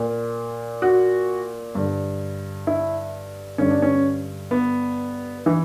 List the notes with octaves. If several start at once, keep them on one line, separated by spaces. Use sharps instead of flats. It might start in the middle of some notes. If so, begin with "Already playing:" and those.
Already playing: A#2
F#4
G2 D3
E4
G2 D3 C#4
D4
C#4
B3
E3